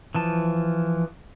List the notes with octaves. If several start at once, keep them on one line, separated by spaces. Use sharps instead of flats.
E3 F3 A5